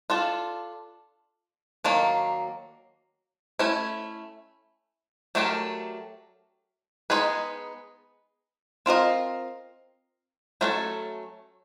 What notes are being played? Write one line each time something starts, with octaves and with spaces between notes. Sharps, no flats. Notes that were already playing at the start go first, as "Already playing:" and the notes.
D4 F4 A4
D#3 F#3 A#3 D4
A3 C#4 E4
F#3 A3 D4 G4 A#4
G#3 B3 D#4 G#4 B4
C4 F4 A#4 D#5
F#3 A3 C#4 F4 A4